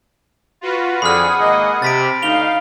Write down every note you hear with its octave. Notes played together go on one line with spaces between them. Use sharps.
F4 F#4 B4
F2 D3 G#4 F#5 B5 D#6 F6
G#1 A#3 D#5
C3 A6 B6 D7
D2 D#4 F5 F7 G7